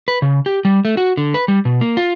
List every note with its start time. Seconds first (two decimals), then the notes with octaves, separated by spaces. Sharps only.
0.08 B4
0.22 C#3
0.46 G4
0.65 G3
0.85 A3
0.97 F#4
1.17 D3
1.34 B4
1.48 G3
1.65 B2
1.81 A#3
1.97 F4